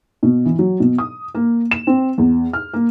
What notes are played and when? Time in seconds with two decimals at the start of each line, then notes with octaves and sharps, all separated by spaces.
0.23 B2
0.45 E3
0.59 F#3
0.80 B2
0.98 D#6
1.35 A#3
1.71 E7
1.87 C4
2.18 E2
2.53 F6
2.74 A#3